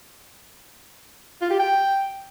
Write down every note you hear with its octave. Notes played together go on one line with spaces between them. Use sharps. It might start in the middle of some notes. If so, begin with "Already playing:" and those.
F4
G4
G5